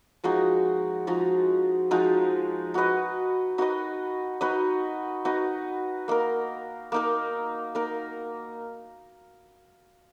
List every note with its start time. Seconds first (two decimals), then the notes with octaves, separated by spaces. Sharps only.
0.24 F3 G#3 D#4 F#4
1.07 F3 G#3 D#4 F#4
1.91 F3 G#3 D#4 F#4
2.74 D#4 F#4 B4 D#5
3.58 D#4 F#4 B4 D#5
4.41 D#4 F#4 B4 D#5
5.25 D#4 F#4 B4 D#5
6.08 A#3 D#4 A#4
6.92 A#3 D#4 A#4
7.75 A#3 D#4 A#4